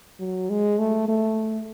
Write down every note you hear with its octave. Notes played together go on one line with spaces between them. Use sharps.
F#3
G#3
A3
A3